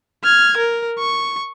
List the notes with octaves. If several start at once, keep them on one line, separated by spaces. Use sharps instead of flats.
F6 G#6
A#4
C#6